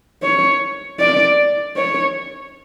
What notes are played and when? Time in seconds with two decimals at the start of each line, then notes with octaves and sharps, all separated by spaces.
0.23 C#5
1.00 D5
1.76 C#5